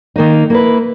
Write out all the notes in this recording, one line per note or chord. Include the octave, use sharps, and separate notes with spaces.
D#3 A#3 D#4
A#3 E4 B4